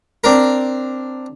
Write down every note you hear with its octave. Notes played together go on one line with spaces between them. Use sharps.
C4 D4 A#4